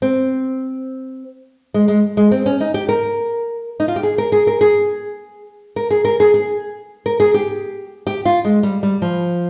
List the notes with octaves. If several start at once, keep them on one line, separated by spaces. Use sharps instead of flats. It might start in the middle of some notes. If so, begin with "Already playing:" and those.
C4
G#3
G#3
G#3
C4
C#4
D#4
G4
A#4
D#4
F4
G4
G#4
A#4
G#4
A#4
G#4
A#4
G#4
A#4
G#4
G#4
A#4
G#4
G4
G4
F4
G#3
G3
G3
F3